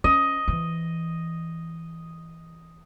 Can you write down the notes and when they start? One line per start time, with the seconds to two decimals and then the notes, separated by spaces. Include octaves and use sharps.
0.04 C#4 D#5
0.48 E3